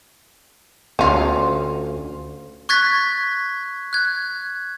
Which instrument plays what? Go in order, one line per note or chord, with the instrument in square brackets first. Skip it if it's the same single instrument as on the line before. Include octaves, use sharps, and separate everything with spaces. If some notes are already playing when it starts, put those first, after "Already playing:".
[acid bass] D2 [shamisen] C#4 F4
[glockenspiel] C#6 F#6 G#6 A6 B6
F#6 G#6